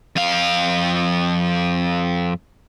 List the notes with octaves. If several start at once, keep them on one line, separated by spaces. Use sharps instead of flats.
F2 F5